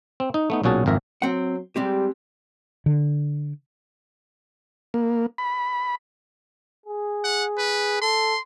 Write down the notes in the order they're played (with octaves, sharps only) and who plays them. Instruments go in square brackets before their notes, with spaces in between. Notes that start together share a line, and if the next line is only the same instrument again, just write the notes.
[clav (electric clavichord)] C4
D#4
A3 B3 D#4
B1 A#2 C#4 F#4 G#4 A5
G#1 F2 A#4 E5 A#5
[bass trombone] F#3 [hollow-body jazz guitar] C4 F#5
[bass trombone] G3 [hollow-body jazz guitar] G#3 C4 G4
[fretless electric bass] D3
[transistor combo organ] A#3
B5
[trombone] G#4
[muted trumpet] F#5
B4
[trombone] A4 [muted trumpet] C6